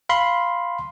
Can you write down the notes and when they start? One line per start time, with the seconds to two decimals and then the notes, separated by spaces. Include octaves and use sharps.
0.09 F5 B5 C6